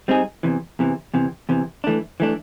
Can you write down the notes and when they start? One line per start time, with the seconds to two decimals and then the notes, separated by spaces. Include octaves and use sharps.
0.08 G3 C4 D#4 G#4
0.43 E2 C3 E3
0.79 E2 C3 E3
1.14 E2 C3 E3
1.49 E2 C3 E3
1.84 E3 A3 D4
2.20 E3 A3 D4